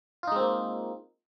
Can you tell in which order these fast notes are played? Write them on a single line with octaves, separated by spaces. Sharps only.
F4 D#4 G#3 C4 A#3